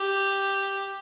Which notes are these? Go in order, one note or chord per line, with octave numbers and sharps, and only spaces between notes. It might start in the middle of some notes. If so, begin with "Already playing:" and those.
Already playing: G4